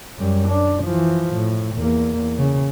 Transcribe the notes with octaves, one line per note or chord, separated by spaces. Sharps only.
F#2 G3
D4
E3 F3
A2
E2 A#3
C#3